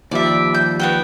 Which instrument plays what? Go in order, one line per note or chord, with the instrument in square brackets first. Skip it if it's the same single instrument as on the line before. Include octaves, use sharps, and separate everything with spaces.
[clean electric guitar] D#2 F3 G3 [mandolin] D5 E5
[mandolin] G6
B3 F#4 G5